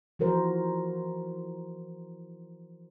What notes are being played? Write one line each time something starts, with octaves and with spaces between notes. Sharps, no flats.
E3 F3 F#4 A#4 C5